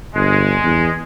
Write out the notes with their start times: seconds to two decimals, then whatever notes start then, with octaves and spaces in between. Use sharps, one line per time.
0.14 G1 G#3
0.64 E2